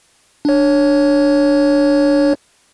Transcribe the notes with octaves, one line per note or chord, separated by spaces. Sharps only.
D4 C#5